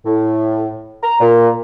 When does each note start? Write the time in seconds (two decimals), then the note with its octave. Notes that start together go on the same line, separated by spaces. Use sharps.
0.06 A2
1.03 A#5
1.21 A#2